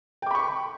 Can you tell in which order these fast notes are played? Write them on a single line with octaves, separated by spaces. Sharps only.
G5 D6 B5 C#6